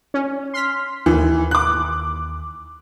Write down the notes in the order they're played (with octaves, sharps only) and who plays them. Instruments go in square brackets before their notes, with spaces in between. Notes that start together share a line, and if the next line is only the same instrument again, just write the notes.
[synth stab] C#4
C6 F6 B6
[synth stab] D#2 [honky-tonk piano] E3
[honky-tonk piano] D6 F#6